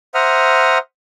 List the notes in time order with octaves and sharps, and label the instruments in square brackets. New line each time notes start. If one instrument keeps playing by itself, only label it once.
[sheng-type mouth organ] C5 E5 F#5 A#5 D#6 F6